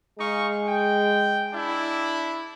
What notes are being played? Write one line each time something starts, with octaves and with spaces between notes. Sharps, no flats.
G#3 D#4 F5 C#6
G5
D4 E4